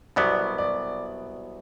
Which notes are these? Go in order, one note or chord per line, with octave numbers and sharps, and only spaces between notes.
C2 B2 F#3 B3 D5
D5